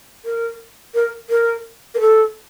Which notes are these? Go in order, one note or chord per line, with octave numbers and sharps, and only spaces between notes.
A#4
A#4
A#4
A#4
A4